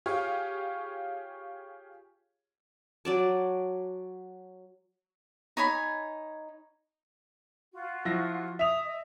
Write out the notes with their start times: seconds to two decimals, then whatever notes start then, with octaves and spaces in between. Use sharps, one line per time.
0.06 F4 G4 G#4 C#5 F5
3.05 F#3 D5 A5
5.57 D#4 C#5 G#5 B5
7.73 F4 F#4
8.05 F3 E4 A#6
8.59 E5 D#6 F7
8.84 D#5